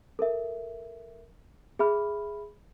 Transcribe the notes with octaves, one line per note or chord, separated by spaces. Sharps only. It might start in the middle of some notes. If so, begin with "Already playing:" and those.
A4 A#4 E5
G#4 E5 B5 F6